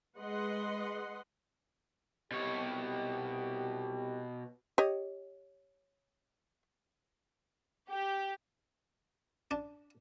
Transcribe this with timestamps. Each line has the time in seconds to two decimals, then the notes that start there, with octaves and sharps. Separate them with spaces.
0.18 G#3 B4 D#5 F#5 C6
2.32 C2 B2 G4 C#5
4.78 G4 C#5 D#5
7.90 G4
9.51 D4